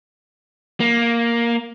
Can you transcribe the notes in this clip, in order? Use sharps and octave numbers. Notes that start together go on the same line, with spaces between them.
A#3